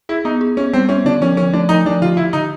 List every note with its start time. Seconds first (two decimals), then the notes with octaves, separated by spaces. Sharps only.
0.09 E4 G#4
0.25 B3 D#4
0.41 G#4
0.57 B3 C#4
0.73 G3 C4
0.89 B3 C#4
1.05 D3 D4
1.21 F3 C#4
1.37 F3 C#4
1.53 A3 D4
1.69 F3 D#4
1.85 F3 D4
2.02 D3 F4
2.17 D3 E4
2.33 D3 D#4